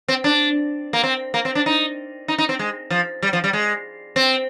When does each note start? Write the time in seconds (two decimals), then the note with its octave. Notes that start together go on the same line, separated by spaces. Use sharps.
0.08 C4
0.24 D4
0.93 A#3
1.03 C4
1.34 A#3
1.45 C4
1.55 D4
1.66 D#4
2.28 D#4
2.38 D#4
2.49 C4
2.59 G#3
2.90 F3
3.22 G3
3.33 F3
3.44 G3
3.53 G#3
4.16 C4